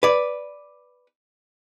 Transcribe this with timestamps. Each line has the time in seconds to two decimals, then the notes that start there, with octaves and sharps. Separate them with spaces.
0.03 B4 D5